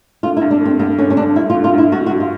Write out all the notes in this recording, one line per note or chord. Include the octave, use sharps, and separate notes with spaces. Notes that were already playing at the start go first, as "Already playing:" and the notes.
D3 F4
E4
G2
D4
D3 C4
G2 B3
D3 C#4
C#4
D3 D4
G2 E4
F4
D3
F4
G2 E4
G2 F#4
F#4
G2
F4